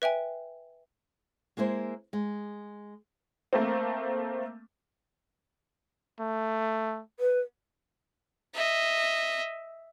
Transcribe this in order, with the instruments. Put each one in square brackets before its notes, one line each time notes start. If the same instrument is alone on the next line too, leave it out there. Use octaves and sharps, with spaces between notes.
[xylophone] B4 E5 G5 G#5
[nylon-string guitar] G#3 A#3 E4 C5
G#3
[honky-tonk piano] A3 A#3 C4
[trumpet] A3
[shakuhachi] B4
[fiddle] D#5 E5